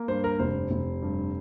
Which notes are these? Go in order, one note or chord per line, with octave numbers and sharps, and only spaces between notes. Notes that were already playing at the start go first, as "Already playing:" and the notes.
Already playing: A#3
G2 C5
A#4
F1 C5
F1
G2